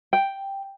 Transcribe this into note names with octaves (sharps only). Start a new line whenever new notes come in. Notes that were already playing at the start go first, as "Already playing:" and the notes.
G5